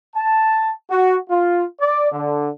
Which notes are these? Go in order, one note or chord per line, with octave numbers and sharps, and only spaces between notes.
A5
F#4
F4
D5
D3